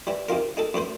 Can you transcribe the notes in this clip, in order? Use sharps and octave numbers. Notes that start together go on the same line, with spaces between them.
E3 G3
C3 D#4 F4 A#4
D#4 G#4 A4
F#2 A2 B4 C5